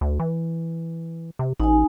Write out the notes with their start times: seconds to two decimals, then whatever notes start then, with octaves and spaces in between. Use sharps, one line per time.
0.01 D2
0.20 E3
1.39 C3
1.60 A1 D#4 G#5